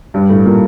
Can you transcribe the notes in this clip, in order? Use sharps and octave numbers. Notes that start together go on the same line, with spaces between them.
G2 G3
A2 A3
A#2 A#3